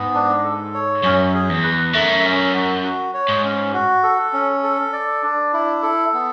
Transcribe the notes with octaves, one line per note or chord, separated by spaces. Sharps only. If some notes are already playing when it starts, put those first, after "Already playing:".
Already playing: G#2 B3
D4
A4
C#5
F#2 C#4
G#4
E2
B4
F#2 A3
C#4
F#4
F#4
C#5
G#2
C#4
F#4
A4
C#4
A4
D5
D4
E4
A4
B3